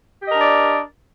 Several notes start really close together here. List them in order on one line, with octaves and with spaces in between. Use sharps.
G4 D#5 A#4 D4 D5